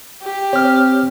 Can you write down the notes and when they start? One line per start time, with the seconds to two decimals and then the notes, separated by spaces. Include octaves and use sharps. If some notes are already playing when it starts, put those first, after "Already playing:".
0.22 G4
0.53 C4 C#5 F6